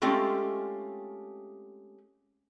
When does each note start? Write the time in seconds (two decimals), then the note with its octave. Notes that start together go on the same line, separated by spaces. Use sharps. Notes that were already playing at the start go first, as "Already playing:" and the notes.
0.02 G#3 A3 C4 C#4 F4 G4